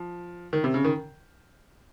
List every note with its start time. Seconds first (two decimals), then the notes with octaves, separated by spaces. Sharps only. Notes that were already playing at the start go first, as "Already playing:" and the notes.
Already playing: F3
0.53 D#3
0.64 C3
0.74 C#3
0.84 D#3